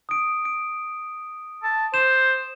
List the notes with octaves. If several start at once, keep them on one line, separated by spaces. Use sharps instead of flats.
D#6 D7
D7
A5
C5 E7